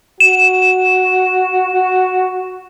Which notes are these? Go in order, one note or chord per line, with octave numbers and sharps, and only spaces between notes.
F#4 E7